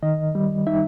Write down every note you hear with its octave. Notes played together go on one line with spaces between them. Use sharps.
D#3 D#5
G3
D#4 E5